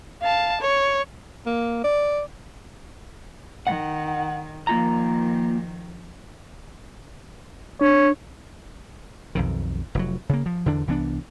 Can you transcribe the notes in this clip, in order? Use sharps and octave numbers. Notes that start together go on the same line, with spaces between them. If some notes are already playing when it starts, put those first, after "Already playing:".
F5 A5
C#5
A#3
D5
D#3 F#5
D#3 F3 A#3 F4 A#5
D4 C#5
B1 F2 D#3
F1 F#3
C#3 A#3
F3
E2 D3 D4
C2 E3 B3 D4